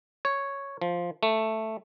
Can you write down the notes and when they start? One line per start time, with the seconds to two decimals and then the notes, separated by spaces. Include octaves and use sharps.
0.25 C#5
0.82 F3
1.23 A3